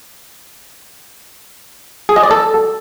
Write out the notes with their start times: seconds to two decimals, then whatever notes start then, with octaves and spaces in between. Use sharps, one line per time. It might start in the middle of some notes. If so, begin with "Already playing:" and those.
2.09 G#4
2.16 D#5
2.23 D5
2.31 A4